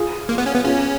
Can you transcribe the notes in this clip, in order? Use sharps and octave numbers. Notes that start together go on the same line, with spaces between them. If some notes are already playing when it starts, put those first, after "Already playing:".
Already playing: F4 G#4
A#3
B3
C#4
B3
C#4 F4 G#4